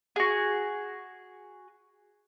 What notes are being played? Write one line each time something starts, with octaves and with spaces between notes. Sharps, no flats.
F#4 G#4